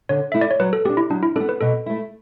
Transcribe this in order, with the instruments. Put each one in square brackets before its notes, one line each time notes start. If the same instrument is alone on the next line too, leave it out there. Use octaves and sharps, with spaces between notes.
[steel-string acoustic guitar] D3 [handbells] C#5
[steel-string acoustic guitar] A3 E4 [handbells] E5
[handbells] D5
C#5
[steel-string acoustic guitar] F#3 [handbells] B4
[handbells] A4
[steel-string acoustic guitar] B3 [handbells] G4
[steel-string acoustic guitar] D4
[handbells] E4
[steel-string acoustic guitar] F#3 [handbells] D4
[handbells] E4
[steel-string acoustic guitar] D4 [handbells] A4
[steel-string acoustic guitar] B3
[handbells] B4
[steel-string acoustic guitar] B2 [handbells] A4
[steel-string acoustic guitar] A3 E4